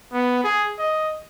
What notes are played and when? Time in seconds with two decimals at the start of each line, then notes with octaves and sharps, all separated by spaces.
0.12 B3
0.44 G#4
0.79 D#5